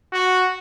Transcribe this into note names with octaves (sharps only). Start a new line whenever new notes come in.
F#4